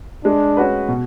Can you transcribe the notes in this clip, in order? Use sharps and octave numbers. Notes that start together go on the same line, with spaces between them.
G#3 D4
C#4 F#4 B4
B2